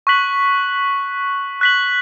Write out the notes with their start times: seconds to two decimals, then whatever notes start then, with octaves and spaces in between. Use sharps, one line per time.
0.07 C#6 F#6 B6 F#7
1.61 F#6 B6 F#7